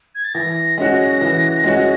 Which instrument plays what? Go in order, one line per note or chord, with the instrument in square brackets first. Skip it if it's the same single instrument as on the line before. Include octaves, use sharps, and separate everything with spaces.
[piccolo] G#6
A6
[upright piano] E3 [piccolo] A#6
[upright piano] G#3 C#4 F#4
E3
G#3 C#4 F#4